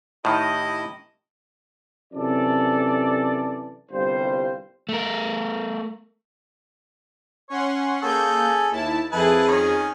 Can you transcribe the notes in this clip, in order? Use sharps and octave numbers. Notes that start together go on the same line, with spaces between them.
A2 D#3 E4 G4 D#5
F#2 C3 E3 A4 D5
G1 C2 G3 F4 C5
A3 A#4
C#4 C#5 F#5 C6
A#3 C#4 G#4 A4 G6
D#2 E4 A5
F2 E4 G#4 B4 A5
D#3 C#4